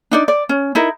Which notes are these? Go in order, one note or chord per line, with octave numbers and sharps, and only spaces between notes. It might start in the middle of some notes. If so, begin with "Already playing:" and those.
D4 D#4 D5
D5
C#4
D#4 E4 A#4